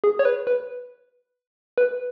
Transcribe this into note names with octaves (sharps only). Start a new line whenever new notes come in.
G#4
C#5
B4
B4
B4